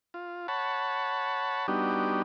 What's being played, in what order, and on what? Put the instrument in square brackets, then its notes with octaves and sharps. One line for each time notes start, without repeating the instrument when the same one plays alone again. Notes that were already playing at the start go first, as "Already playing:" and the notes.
[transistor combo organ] F4
C#5 F#5 A5 B5
G3 B3 D4 D#4 F#4 G4